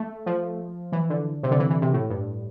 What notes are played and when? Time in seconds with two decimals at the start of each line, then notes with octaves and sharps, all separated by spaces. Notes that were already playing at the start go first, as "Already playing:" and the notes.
Already playing: A3
0.26 F3
0.92 E3
1.10 D3
1.43 C3
1.51 D3
1.59 E3
1.70 E3
1.82 C3
1.93 A2
2.10 G2